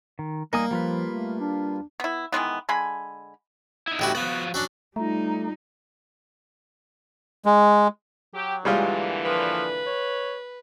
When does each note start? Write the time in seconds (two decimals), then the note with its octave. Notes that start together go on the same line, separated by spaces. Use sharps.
0.19 D#3
0.53 G3 A#3 D#4 G#5 D#6
0.71 F3 G3 F4 B4
1.13 A3
1.40 D4
2.00 B3 E4
2.32 D#3 E3 G#3 B3
2.69 D3 G#3 G#5 B5
3.87 D#4 E4
3.99 A1 G3 F#4
4.15 F3 B3 F4 F#4
4.54 F#3 C#4 D4
4.96 G3 A3 D#4 F4 A#5
7.46 G#3
8.34 F#3 G4
8.65 A#2 D3 E3 G3 G#3 F4
9.25 F3 B4
9.86 C#5